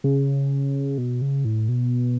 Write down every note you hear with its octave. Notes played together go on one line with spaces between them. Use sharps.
C#3
B2
C#3
A2
B2